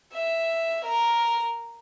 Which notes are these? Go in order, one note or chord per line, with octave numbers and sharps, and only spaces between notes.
E5
A#4